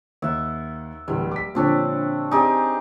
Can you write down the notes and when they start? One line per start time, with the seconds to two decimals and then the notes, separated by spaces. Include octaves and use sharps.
0.22 D#2 E5 F#5
1.08 D1 E2 G3
1.32 D6 B6
1.55 A#2 D3 F3 C4 D4 C#5
2.31 C4 D#4 G4 G#4 D5 G#5